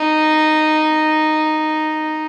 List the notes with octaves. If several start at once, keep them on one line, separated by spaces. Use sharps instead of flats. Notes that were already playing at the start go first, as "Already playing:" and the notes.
Already playing: D#4